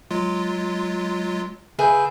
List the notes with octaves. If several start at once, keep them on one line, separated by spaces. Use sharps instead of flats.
F#3 G#3 F4
C#3 G#4 B4 E5 G6